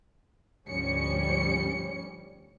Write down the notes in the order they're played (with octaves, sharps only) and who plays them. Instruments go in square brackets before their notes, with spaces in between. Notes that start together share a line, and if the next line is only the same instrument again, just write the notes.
[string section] D2 G#2 F3 G3 C#4 C#7